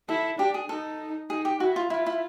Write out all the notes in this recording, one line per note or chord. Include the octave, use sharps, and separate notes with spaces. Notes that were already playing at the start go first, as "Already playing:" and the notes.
E4 A4
D4 G4
G#4
D#4 A4
D#4 G#4
G4
E4 F#4
F4
E4 F4
E4